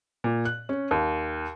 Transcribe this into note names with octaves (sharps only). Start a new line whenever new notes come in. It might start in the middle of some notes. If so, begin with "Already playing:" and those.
A#2
F#6
C#4
D#2